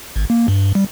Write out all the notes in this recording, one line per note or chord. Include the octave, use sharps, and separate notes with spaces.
G#1
A#3
G2
G3